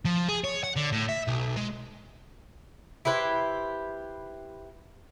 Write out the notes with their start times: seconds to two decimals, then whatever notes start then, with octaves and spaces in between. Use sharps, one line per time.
0.05 F3
0.28 G#4
0.44 C#5
0.64 F#5
0.76 D3
0.92 A2
1.08 E5
1.27 B1
1.56 G#3
3.05 E4 G4 B4 C5